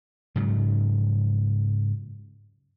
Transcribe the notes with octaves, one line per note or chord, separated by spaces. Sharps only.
G#2 C#3 F#3